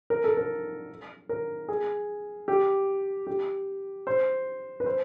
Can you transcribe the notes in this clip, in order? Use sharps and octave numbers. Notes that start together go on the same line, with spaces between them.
A#4
A4
A#4
A#4
G#4
G4
G4
C5
B4
C5